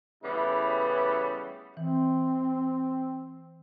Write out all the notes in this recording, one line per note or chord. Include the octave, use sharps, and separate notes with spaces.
A2 C#3 E3 G3 B3 E4
E3 C4